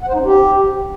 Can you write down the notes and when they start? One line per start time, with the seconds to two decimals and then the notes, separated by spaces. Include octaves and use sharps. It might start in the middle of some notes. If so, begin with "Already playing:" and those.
0.03 F#5
0.08 C5
0.14 D#4
0.19 C#4
0.25 G4